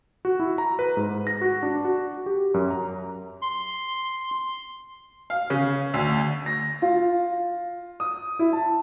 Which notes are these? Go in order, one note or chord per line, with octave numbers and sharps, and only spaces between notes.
F#4
E4
A#5
B4
G#2
A#6
F#4
D4
F#4
G4
F#2
A#5
C6
F5
C#3
D2
A#6
F4
D#6
E4
A5